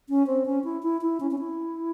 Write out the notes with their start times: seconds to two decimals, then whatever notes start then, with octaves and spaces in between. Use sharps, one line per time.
0.09 C#4
0.27 C4
0.46 C#4
0.64 E4
0.83 E4
1.01 E4
1.20 C#4
1.31 C#4
1.39 E4